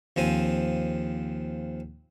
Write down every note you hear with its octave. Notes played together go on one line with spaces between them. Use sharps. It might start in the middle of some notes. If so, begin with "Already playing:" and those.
D#2 F3 C4 G#5